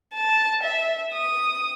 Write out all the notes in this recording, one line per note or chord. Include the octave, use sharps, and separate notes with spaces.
A5
E5
D#6